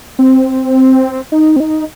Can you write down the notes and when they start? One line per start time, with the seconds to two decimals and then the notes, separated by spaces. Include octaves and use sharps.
0.19 C4
1.32 D#4
1.56 C4
1.60 D#4